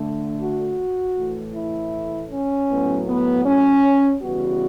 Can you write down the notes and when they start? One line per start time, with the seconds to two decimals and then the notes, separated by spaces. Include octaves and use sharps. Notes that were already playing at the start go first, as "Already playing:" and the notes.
Already playing: D3 A3
0.40 F#4
1.16 A2 E3 A3
1.55 E4
2.31 C#4
2.70 A2 F#3 B3
3.07 B3
3.46 C#4
4.22 C#3 E3 G3 B3 F#4